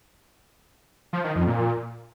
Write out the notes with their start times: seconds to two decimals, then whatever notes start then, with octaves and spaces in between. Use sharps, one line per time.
1.13 F3
1.24 D#3
1.36 F2
1.47 A#2